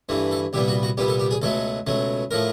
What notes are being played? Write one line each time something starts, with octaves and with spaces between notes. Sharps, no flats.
G2 E3 A3
A4
C2 A#2 G3 B3 G4
F#4
F#4
C2 A#2 G3 B3 G4
A4
G4
G#4
C#2 B2 F#3 A3 A4
C#2 B2 F#3 A3
A2 F3 A3 A#4